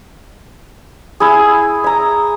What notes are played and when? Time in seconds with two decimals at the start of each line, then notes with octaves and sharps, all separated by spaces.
1.20 E4 G#4
1.84 E5 A#5